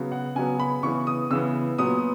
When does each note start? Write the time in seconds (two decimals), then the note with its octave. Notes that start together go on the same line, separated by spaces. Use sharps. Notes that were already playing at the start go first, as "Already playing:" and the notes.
Already playing: C#3 F#3 B3
0.12 F#5
0.35 C#3 F#3 B3 G#5
0.60 B5
0.83 C#3 E3 B3 C#6
1.07 D#6
1.31 C#3 E3 B3 E6
1.78 A#2 F#3 B3 D#6